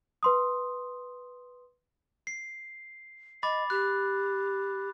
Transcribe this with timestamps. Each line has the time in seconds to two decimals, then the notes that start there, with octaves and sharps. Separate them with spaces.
0.23 B4 C6 D#6
2.27 C7
3.43 D#5 B5 D6 A6
3.70 G4 F#6